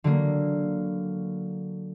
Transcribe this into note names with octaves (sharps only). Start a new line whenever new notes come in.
D3 F#3 A#3